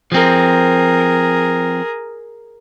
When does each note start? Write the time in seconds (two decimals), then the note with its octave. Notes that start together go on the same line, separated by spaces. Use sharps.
0.12 F3 C4 G#4 A#4